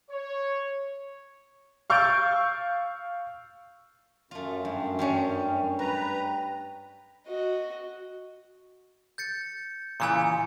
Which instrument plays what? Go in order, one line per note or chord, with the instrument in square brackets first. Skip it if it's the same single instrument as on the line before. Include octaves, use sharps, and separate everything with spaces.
[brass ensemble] C#5
[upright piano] F5 C#6 E6 G6 A6 D7
[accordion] F#2 [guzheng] A3 F4
[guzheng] G2
G2 G3 C#4
[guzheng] G3 [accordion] B4 A#5
[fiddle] F#4 D#5
[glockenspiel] G6 A6 C#7
[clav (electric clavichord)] A#2 C#3 E3 [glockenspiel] G#5 A#5 C#7